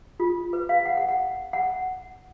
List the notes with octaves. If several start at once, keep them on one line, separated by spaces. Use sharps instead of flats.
F4
B4
F5
F#5
F#5
F#5
F#5